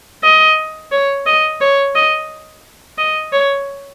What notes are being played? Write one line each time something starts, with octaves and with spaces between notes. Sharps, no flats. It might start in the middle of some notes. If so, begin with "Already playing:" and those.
D#5
C#5
D#5
C#5
D#5
D#5
C#5